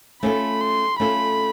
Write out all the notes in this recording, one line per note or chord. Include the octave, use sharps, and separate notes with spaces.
A3 C#4 F4 A4 B5
C6
A3 C#4 F4 A4 B5